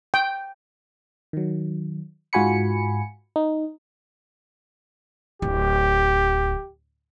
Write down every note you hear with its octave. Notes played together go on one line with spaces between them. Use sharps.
G5
D#3 F#3
G#2 F4 F#4 G#5 B5 C#7
D#4
D1 G4